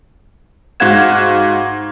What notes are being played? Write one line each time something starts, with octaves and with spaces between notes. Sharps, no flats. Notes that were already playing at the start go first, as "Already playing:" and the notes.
G#2 F#4 F5 F#5 G#6 E7